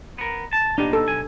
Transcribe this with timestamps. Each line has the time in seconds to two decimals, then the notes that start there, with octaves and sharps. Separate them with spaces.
0.18 B3 A#4
0.53 A5
0.78 A#2 B3 D4 D#4 G4
0.93 A4
1.08 B1 G#5